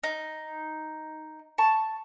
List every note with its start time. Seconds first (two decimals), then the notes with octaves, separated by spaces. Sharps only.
0.04 D#4
1.58 A5 C#6